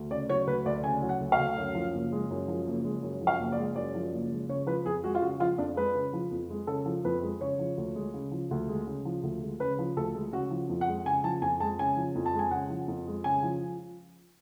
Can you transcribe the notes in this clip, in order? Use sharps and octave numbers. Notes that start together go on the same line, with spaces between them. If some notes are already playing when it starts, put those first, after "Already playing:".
Already playing: D2
C#3 D5
F#3 C#5
D2 B4
D2 D5
C#3 G#5
F#3
F#5
D2
F5
D2
F#2
F3
F#1
G#3
F#2
F3
F#1
G#3
F#2
F3
F5
F#1
D5
G#3
F#2 D5
F3
F#1
G#3
C#3 C#5
F3 B4
F2 G#4
G#3 F#4
F4
C#3 F#4
F3 F4
F2 D4
G#3 B4
C#3
F3
F2
G#3
C#3 A4
F3
F2 B4
G#3
C#3 C#5
F3
D2
G#3
C#3
F3
D2
G#3
C#3
F3
D2
G#3
C#3 B4
F3
D2 A4
G#3
C#3 F#4
F3
F2
F#5
G#3
C#3 G#5
F3 A5
F2 G#5
G#3 A5
C#3 G#5
F3
F2
A5
G#3
G#5
C#3 F#5
F3
F2
G#3
C#3 G#5
F3